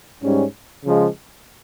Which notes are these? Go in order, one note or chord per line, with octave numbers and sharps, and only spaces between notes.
G#2 G3 C#4
C#3 F3 G#3